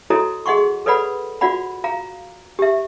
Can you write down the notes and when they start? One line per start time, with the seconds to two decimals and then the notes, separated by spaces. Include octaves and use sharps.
0.10 E4 F#4 A4 C#5 D#5 A#5
0.46 G#4 D#5 F#5 C6 C#6
0.86 A4 B4 C#5 D5 F#5 B5
1.41 F4 F#4 D5 F#5 B5
1.84 F5 A#5
2.59 G4 E5